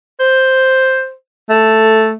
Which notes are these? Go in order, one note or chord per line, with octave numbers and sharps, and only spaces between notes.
C5
A3